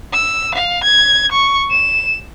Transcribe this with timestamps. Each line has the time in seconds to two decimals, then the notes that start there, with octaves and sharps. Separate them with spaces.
0.13 E6
0.55 F5
0.84 G#6
1.32 C#6
1.71 E7